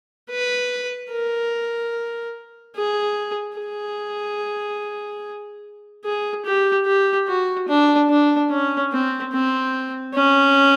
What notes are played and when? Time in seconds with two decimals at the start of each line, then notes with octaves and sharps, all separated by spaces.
0.30 B4
1.12 A#4
2.76 G#4
3.58 G#4
6.05 G#4
6.45 G4
6.86 G4
7.28 F#4
7.69 D4
8.10 D4
8.50 C#4
8.92 C4
9.33 C4
10.15 C#4